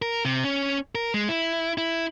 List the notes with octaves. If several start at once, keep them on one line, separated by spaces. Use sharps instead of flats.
A#4
C3
C#4
A#4
G#3
E4
E4